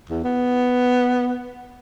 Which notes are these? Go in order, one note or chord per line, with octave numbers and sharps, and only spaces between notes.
E2
B3